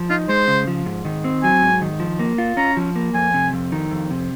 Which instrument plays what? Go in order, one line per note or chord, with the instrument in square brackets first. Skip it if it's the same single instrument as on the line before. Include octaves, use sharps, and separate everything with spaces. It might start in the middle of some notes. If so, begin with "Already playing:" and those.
Already playing: [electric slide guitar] F3
[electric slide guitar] D#4 [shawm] F4
[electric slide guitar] G#3 [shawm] C5
[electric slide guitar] C#3
F3
G#2
D#3
C4
[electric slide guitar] F#3 [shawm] G#5
[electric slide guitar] G#2
D#3
F3
A#3
F4
[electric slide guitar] C#4 [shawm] A#5
[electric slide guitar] F3
A#3
[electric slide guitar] F2 [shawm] G#5
[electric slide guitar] C3
F2
D#3
F2
C3